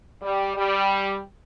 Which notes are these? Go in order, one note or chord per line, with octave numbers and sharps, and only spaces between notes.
G3
G3